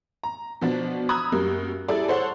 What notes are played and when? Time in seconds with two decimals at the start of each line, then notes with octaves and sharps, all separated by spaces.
0.23 A#5
0.61 B2 F3 B3 D4
1.09 A#5 B5 D#6 E6 F#6 G#6
1.32 F#2 G3 A#3
1.88 G3 E4 G#4 A4 D5
2.08 A4 C5 C#5 F#5